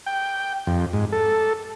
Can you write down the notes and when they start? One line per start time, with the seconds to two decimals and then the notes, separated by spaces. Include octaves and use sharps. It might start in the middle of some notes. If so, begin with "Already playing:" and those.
0.06 G5
0.67 F2
0.93 G#2
1.12 A4